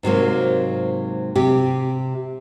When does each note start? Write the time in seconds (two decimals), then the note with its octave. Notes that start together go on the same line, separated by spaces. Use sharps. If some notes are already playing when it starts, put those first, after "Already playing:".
0.03 G#2 C3 F#3 A#3
1.36 C3 G4